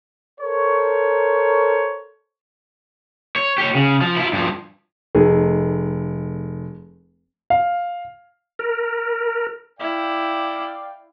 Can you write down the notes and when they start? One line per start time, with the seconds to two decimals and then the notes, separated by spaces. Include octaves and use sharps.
0.40 A4 A#4 C5 C#5
3.36 C#5
3.58 G4 C#5
3.75 C#3
4.01 F3
4.16 E4 F4
4.33 G2 F3
5.15 F1 A3 D#4 G#4
7.50 F5
8.59 A#4
9.80 E4 D5 F5 G5